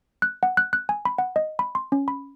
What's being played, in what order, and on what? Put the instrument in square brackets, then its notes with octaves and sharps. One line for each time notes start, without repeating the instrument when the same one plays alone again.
[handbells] F#6
F#5
F#6
F#6
G#5
B5
F#5
D#5
B5
C6
C#4
B5